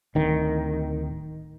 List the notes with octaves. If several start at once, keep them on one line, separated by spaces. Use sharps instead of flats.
D1 D#3